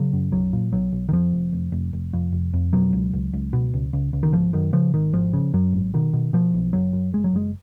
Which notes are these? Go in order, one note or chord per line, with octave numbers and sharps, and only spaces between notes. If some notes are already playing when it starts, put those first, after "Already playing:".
Already playing: C#3 F#3
F#2
B1 F#3
A#2
B1 F#3
B1
D#3
F2 F3
F1
F1
F1
F1
F2
F1
F2
B2 F#3
C#2
C#2
C#2
B2
C#2
C#2
C#2
D#3
G#1 F3
F#2 D#3
C#3 F3
G#1 D#3
G#1 F3
C#3
F#2 F#3
G#1
B2 D#3
B2
B2 F3
B1
F#1 F#3
F#2
F#1 G#3
F#3
F#1 G#3